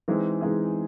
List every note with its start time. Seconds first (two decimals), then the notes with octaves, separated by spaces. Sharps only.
0.08 E3 G#3 C4 D#4 G#4
0.41 E3 G#3 C4 D#4 G#4